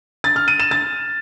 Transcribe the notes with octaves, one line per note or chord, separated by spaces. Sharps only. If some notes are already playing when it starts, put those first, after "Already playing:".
A6
F6
D#7
E7
A6